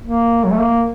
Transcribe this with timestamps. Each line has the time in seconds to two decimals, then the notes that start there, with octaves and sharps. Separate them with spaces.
0.04 A#3
0.44 F#3
0.51 A3
0.59 A#3